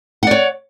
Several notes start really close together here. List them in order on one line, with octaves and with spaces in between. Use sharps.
F#5 D5 C#5